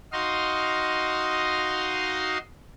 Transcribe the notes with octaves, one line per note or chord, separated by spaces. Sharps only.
D#4 F#4 D#5 F5 C6